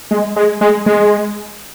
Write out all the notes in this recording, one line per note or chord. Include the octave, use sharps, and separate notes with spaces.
G#3
G#3
G#3
G#3